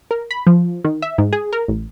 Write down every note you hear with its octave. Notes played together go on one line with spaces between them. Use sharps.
A#4
B5
F3
D#3
E5
G#2
G#4
A#4
A1